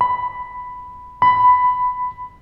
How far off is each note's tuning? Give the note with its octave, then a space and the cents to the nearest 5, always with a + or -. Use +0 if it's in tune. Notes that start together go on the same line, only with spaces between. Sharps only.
B5 +10
B5 +15